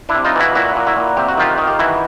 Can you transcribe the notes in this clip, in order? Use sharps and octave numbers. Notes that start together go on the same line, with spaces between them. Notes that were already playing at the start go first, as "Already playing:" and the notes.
D4 E4
C3
D#4 F4
E3 E4 F#4
A#2 E4 F#4
A#2
E4 F#4
A#2
C3 G4
F#4
D#3 F4 G4
D#3
G4
E3 E4 F#4